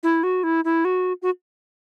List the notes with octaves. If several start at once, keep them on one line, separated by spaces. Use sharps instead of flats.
E4
F#4
E4
E4
F#4
F#4